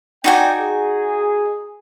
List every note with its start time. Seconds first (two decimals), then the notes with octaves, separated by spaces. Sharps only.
0.24 D#4 F#4 D5 G5 G#5
0.60 G#4